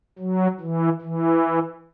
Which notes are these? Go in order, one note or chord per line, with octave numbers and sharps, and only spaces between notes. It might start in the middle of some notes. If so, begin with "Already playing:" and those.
F#3
E3
E3